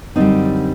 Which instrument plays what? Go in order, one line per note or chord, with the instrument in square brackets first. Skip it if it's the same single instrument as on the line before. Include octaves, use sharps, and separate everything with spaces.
[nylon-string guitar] F#2 D3 G3 C4 D#4